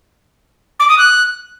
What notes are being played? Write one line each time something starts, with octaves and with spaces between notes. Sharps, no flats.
D6
D#6
F#6